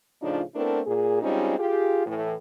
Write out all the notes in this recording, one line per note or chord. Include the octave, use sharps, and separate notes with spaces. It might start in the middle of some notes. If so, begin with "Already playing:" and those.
A2 C#3 F3 D4 D#4 F4
A3 B3 C4 D4 E4 A#4
A#2 G#4
G3 G#3 C4 C#4 D#4 F4
F4 G4 G#4
A2 E3